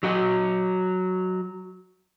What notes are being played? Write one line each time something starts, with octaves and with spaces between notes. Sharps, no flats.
F#3 F#4 D#5